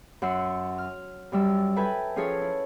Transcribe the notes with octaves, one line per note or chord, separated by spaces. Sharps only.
F#2 F#5 C6 E6
F6
F#2 G3 E6
A4 B4 E5 G5 G#5 B5
F3 C#4 F4 G#4 A4 C#5
E4